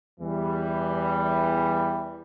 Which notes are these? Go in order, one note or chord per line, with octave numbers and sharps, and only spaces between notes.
E2 E3 G3